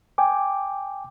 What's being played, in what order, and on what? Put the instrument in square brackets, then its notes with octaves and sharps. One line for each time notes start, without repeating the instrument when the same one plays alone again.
[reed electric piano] G5 G#5 D6